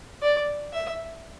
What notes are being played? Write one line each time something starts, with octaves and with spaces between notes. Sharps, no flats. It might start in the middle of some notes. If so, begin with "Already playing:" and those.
D5
E5